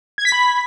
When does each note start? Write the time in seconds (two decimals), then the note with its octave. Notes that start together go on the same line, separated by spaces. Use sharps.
0.18 G#6
0.25 B6
0.32 B5